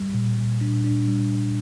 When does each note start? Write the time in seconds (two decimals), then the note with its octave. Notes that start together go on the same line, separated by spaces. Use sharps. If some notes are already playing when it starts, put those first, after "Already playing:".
Already playing: G3
0.14 A#2
0.37 A#2
0.61 D4
0.84 D4
1.08 G3